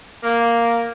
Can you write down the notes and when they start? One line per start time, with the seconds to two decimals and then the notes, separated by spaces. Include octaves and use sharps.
0.24 A#3